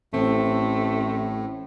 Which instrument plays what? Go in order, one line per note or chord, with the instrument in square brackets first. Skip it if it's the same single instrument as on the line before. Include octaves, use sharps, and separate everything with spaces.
[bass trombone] A1 [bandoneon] A2 [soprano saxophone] A3 [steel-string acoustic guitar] C4